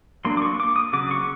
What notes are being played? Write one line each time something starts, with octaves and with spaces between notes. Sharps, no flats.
F#3 A#3 D4 C6
D6
C#6
D6
D#6
C#3 F#3 D6
C#6